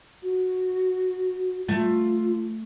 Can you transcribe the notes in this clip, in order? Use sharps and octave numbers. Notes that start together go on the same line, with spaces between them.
F#4
A3 F4